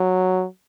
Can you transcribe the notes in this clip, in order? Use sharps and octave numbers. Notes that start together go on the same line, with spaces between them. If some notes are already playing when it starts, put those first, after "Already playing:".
Already playing: F#3